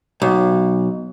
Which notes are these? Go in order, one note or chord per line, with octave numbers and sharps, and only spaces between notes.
B1